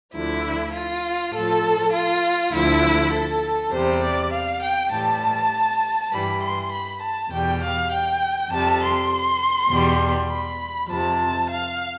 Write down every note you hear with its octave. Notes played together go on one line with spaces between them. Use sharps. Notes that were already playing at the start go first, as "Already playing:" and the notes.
D2 D3 F3 E4
F4
A2 F3 A4
F4
D2 D3 F3 E4
A4
E2 C3 G3 C5
D5
F5
G5
A2 E3 G3 A5
G2 E3 G3 B5
C6
B5
A5
E2 B2 G3 G5
F5
G5
F2 C3 G3 A5
C6
E2 B2 G3
B5
F2 C3 F3 A5
F5